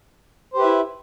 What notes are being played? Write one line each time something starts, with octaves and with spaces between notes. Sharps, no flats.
E4 G4 B4 C5 E5